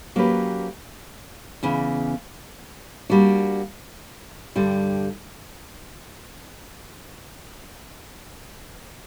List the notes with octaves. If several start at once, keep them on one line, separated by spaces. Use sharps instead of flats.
F#3 A#3 C#4 G4 B4
E2 C#3 E3
G3 A#3 D4 F#4
G2 D3 G3